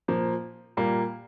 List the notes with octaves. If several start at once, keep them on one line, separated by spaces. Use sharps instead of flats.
A#2 F3 A#3
A#2 G3 A#3